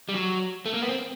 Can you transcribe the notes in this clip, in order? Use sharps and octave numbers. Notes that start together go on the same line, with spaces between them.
G3
F#3
A3
A#3
B3
C4